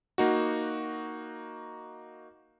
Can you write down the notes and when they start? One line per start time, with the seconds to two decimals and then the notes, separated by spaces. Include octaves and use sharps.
0.18 A#3 D#4 F#4